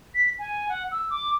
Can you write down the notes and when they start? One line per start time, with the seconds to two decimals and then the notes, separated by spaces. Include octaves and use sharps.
0.15 B6
0.39 G#5
0.69 F#5
0.92 E6
1.10 D6